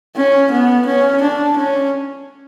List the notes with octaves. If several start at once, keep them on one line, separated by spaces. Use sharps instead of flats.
C#4
B3
C#4
D4
C#4